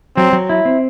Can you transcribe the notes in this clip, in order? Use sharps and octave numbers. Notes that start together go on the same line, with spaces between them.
F#3 C4
F#3
E4
C4